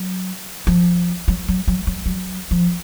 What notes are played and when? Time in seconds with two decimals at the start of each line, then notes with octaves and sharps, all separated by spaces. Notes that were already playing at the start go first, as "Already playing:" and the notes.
Already playing: F#3
0.67 F3
1.28 F#3
1.48 F#3
1.68 F#3
1.87 F#3
2.06 F#3
2.51 F3